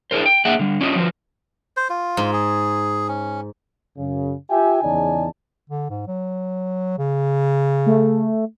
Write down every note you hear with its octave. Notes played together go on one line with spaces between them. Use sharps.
D4 E4 G#4 A#4 C5
G5
A#3 D4 G#4 E5 F#5 G5
D3 G3
C#4 D4 F4 G4 C5 D#5
F3 F4 F#4 B4
C5
F4
G#2
G#4
C#4
F#2 C#3
F4 G4 E5 G5 G#5
E2 C#3 D#4 D5 G#5 A5
D3
G#2
F#3
C#3
A3